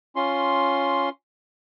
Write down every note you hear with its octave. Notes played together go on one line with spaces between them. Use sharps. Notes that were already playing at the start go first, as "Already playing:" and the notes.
C#4 F4 C6